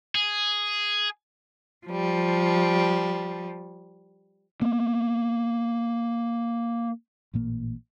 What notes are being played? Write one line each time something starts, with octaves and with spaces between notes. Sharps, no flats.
G#4
F3 G3
A#3 B3
A1 A#2 A#3